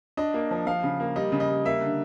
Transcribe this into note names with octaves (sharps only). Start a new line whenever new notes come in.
D4 D#5
A#3
F3
F3 F5
C#3
A#3
G3 D#5
C#3
D#5
G3
A#3 E5
D3